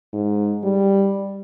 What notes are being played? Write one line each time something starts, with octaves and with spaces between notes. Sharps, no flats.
G#2
G3